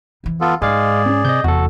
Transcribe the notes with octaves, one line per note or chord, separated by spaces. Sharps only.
F2 E3
B3 F4 A4
G#2 G#3 G#4 D5 F5
C4 C#4
C3 D#5 G6
F1 E2 F#4 A4